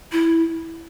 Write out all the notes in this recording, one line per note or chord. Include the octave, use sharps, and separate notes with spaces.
E4